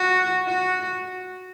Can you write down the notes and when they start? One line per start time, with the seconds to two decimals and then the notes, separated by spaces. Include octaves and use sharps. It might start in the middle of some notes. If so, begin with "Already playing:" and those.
Already playing: F#4
0.48 F#4